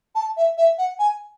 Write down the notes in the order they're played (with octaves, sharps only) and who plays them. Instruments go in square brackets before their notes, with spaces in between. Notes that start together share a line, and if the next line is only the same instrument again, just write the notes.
[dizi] A5
E5
E5
F#5
G#5